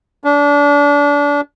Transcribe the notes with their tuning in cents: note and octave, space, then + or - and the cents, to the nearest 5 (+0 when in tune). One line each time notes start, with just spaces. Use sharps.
D4 -30